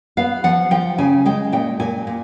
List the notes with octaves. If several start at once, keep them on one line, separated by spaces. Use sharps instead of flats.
B3 F5
F3 F#5
F3 G5
C#3 G#5
G#3 G5
A#2 G5
A#2 G#5
A#2